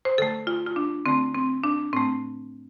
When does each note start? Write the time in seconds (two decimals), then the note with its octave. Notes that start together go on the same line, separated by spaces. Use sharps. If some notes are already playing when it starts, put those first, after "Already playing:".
0.05 C5
0.18 D3 A3 A4
0.47 F4
0.67 F4
0.76 D4
1.06 D3 A3 C4
1.35 C4
1.64 D4
1.93 A2 A3 C4